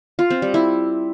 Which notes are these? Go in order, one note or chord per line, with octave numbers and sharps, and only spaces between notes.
F4
C4
G3
E4